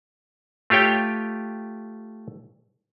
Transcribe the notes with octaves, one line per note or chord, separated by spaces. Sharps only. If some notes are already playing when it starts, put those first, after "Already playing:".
A3 F4 G4 C#5 G5